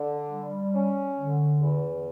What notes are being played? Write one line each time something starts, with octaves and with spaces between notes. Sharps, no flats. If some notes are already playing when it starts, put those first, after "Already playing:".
Already playing: D3
G3
C#4
D3
E2